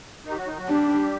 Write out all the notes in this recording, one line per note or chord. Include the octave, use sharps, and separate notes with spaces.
D#3 D#4
G4
F#3 F#4
D#3 D#4
F#3 F#4
G3 D4 G4